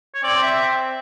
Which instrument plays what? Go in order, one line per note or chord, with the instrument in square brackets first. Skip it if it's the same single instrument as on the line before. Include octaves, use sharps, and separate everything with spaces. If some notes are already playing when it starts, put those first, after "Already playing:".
[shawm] C#5
[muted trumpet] C4 [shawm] D5
[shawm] E5